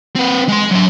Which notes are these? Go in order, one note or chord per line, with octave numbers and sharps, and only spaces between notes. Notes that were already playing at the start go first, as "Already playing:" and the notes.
C4 B4
G#3 C6
F#3 E5